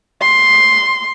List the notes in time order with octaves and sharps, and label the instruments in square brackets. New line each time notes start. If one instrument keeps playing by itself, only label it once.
[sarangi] C6